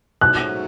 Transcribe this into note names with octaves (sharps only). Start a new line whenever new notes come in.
G#2 F#3 A3 C#4 F#6